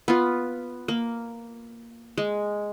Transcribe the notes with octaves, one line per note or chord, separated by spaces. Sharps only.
B3 F4
A#3
G#3